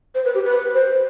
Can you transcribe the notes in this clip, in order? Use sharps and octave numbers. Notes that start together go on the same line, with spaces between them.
C5
B4
G4
B4
C5